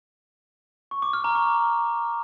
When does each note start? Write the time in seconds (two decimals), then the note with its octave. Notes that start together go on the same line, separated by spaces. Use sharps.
0.91 C#6
1.02 D6
1.13 F6
1.24 A#5
1.35 C#6